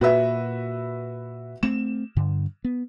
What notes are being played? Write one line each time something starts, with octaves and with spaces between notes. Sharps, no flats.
A#2 F#4 B4 E5
A3 C4 E7
G2 D3
B3